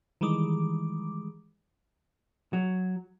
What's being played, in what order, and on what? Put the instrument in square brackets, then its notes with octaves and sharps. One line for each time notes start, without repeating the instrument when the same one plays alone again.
[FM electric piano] D#3 E3 G3 G#3 D6
[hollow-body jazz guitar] F#3